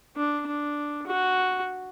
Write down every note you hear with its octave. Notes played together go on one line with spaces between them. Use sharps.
D4
D4
F#4